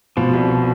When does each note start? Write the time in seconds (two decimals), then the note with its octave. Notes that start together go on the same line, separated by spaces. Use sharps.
0.17 B2 F3
0.33 C2